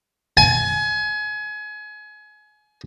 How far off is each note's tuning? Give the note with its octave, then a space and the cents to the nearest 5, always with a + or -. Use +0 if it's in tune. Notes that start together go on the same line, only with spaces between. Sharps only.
G#5 +30